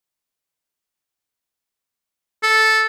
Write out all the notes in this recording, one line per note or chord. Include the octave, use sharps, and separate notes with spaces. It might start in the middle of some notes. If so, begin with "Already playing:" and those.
A4